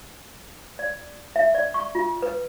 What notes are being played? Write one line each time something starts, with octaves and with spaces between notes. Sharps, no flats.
D5
E5
D5
C#6
F4
B4